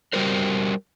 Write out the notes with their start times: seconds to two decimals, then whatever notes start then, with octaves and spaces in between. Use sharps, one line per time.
0.13 G3 F#4 G4 A#4 C5